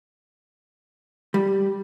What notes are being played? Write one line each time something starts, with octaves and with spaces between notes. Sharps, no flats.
G3